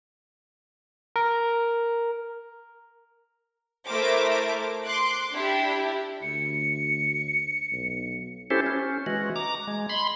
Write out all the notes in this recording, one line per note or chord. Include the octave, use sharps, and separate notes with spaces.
A#4
A3 E4 A#4 C5 D6
C6 D6 F#6
D4 E4 G4
D2 C#7
B1
C#4 E4 G4 A4 C5
C#4
E3 G#3 F#4
A#5 D6
G#3
B5 C6